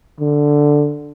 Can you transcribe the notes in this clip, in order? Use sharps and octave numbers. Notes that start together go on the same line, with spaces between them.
D3